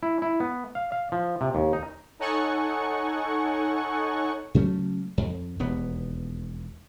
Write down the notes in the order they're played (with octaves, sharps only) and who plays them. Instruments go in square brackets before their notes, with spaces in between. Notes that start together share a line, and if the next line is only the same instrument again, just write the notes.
[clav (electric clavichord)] E4
E4
B3
F5
F5
F3
C3
D#2
D#4
[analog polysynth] D#4 A4 C#5 F#5 G#5 C#6
[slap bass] C#3 F#3 A3 C#4
F2
E1 D#2 B3